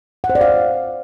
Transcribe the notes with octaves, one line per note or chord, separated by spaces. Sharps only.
F#5
C5
D5
F5